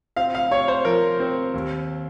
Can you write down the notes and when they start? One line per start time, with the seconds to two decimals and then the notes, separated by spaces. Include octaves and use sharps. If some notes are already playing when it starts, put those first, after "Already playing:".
0.16 C4 F5
0.35 F5
0.51 C4 C#5
0.68 C5
0.85 F3 A#4
1.20 C4
1.54 D#2